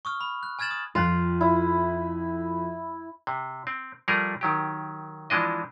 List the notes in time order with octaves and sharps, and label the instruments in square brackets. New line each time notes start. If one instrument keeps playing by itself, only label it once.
[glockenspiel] C#6 D#6 F6
B5
F#6
G#5 F6 G#6 A6 E7 F#7
D#6
[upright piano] F2 F#6 [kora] F4
[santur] E4
[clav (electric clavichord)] C3
C4
F3 G3 A3 G#4 A#4
D#3 F#3 G4
E3 F3 G#3 D4 D#5